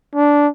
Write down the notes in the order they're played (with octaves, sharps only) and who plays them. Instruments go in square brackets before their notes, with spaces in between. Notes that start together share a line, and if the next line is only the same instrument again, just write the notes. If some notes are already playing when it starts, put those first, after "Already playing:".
[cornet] D4